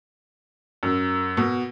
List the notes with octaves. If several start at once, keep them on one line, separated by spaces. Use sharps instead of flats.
F#2
B2